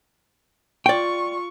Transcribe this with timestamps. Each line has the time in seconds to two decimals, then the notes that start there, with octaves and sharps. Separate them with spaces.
0.86 F4 D5 G5 C#6